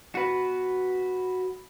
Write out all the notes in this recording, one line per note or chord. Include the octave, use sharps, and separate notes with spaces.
F#4 B4